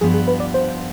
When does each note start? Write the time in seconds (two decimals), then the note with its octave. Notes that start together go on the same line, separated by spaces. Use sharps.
0.01 G2 F3 B3 F4 G#4
0.14 G#4
0.28 B4
0.40 D5
0.54 C5